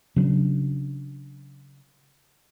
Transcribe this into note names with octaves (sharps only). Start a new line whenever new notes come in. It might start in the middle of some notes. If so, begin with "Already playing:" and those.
C#3 F#3 C#4 D4